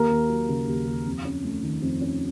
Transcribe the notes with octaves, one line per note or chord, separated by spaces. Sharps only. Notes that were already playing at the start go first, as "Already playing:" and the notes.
Already playing: D#2 A#3 A#4
D#2
F#3
C#3
D#2
D#2
F2
C#4
A3
D#3
F2
C#4